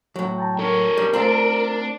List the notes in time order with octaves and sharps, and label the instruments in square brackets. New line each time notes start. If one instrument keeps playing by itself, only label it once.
[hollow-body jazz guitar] A2 F#3
[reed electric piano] G5 A5 A#5
[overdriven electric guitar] D4 C#5 [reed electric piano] A4 [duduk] A#4
[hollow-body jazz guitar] G3
[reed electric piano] A3 C5 [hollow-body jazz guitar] C4 F4 A4 [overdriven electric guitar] D4 D5